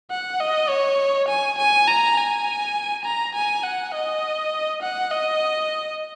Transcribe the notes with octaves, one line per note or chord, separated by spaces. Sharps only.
F#5
D#5
C#5
G#5
G#5
A#5
G#5
A#5
G#5
F#5
D#5
F#5
D#5